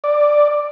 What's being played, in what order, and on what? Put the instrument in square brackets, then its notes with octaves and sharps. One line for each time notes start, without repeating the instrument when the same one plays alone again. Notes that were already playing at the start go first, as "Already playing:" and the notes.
[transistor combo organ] D5